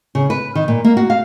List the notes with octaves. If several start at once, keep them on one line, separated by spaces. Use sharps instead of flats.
C#3
B4
D#3
A#2
A#3
F#4
F5